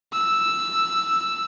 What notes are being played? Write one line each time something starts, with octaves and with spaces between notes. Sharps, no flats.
E6